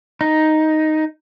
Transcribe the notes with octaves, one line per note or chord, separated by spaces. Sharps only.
D#4